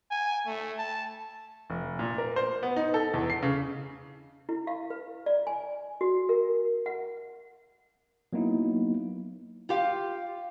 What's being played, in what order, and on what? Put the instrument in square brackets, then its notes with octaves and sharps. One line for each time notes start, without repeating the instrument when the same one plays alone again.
[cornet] G#5
A3
A5
[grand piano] F1
A#2
A#4
C5
B3
D#4
A4
E2
C7
C#3
[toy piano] E4
F5
B4
D5
G#5
F#4
A#4
F#5
[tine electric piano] F#3 A#3 B3 D#4 E4
[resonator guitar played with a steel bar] F4 G4 F5